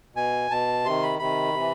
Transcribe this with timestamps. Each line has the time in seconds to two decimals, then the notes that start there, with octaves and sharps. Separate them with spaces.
0.15 B2 G#5
0.51 B2 A5
0.84 C3 D#3 C6
1.03 B5
1.19 C3 D#3 B5
1.54 C3 E3